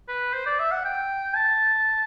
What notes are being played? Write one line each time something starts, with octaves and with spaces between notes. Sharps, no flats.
B4
C5
D5
E5
F#5
G5
A5